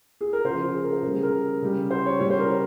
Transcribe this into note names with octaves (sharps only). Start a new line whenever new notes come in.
G#4
A#4
C#3 F3 C5
G#4
A#4
C5
C#3 A#4
G3 G#4
A#4
C#3 G3
C5
C#5
C#3 G3 C#5
C5
A#4